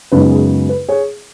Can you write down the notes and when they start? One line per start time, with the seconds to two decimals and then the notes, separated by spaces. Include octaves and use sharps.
0.12 F#2 C#3 G#3 B3 D#4 B4
0.31 G#4
0.69 B4
0.88 G#4 C#5